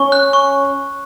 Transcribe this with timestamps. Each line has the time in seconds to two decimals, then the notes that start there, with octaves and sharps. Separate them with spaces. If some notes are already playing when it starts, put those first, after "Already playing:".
Already playing: C#4 C#6
0.12 F#6
0.33 C#6